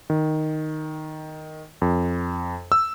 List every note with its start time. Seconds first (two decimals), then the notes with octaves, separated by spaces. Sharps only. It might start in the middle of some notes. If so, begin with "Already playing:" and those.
0.10 D#3
1.82 F2
2.72 E6